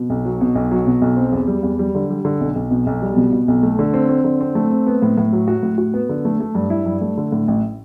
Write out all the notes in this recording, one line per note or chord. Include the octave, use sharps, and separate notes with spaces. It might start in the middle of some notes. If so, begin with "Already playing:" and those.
Already playing: B2
B1
F#3
B2
B1
F#3
B2
B1
C4
E2
G3
E2
G3
D3
G3
D3
B1
B1
B2
B1
G3
B2
B2
B1
A3
D3
C4
C4
D3
C4
A3
C4
B3
A2
A2
F#3
F#4
A2
F#4
B3
D3
A3
A3
G2
E4
G2
A3
D3
A2
A1